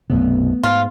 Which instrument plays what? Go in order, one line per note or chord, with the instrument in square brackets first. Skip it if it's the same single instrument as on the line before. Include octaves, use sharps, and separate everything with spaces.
[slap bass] B1 F#2 C3 [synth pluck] A3 B3
[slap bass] G#2 [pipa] F4